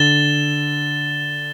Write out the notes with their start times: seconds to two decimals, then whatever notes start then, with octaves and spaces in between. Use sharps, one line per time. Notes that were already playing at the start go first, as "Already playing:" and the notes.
Already playing: D3 A6 E7 G7